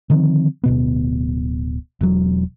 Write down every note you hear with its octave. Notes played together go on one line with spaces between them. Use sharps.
D3 D#3 F3 C4
D1 B2 B3
E1 F#3